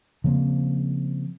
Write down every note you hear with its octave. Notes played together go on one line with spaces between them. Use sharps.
C#3 F3 A#3 C4